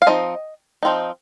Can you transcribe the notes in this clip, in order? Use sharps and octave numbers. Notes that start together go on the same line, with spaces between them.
F5
F3 C4 D#4 D#5
F3 C4 D#4